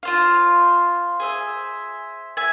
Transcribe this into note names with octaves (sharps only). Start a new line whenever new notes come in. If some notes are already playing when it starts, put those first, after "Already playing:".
F4 C5 F5
G#4 C5 E5
E5 G#5